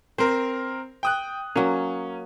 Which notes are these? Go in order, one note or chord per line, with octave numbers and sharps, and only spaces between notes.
C4 A#4 C5
G5 D#6 F#6
F#3 A#3 C#4